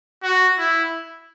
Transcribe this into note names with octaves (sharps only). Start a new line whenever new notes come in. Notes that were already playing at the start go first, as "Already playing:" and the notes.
F#4
E4